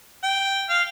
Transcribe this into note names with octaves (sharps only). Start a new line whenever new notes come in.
G5
F5